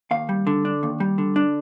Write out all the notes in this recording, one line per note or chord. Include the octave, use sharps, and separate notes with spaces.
D#2 F5
G3
D3
D4
D#2
G3
D3
D4